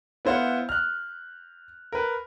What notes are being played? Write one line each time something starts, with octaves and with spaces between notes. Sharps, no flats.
B3 E4 C5 F5 F#5
F6 F#6
A#4 B4